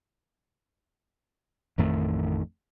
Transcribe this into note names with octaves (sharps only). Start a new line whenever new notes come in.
A1 F2 D#3 A3